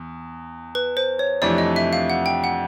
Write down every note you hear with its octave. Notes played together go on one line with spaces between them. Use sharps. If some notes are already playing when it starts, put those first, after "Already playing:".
Already playing: E2
B4
C5
C#5
F2 C3 E3 A3 D4 D5
D#5
E5
F5
F#5
G5
F#5